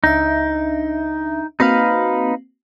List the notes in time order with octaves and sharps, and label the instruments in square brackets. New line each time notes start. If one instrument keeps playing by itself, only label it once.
[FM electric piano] C#2 D4 E5 [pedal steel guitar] D#4
[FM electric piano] A#3 C4 F#4 [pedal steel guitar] D#4 B4 F5